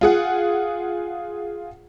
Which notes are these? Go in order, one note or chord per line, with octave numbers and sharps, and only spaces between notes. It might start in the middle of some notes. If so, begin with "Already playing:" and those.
F4 G#4 F#5